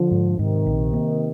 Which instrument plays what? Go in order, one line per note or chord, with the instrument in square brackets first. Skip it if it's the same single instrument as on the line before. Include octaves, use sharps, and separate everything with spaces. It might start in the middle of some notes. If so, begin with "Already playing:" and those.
Already playing: [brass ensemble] D3 F3
[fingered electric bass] G#2
[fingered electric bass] G#2 [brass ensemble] C3 D#3
[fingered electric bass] A#1
A#3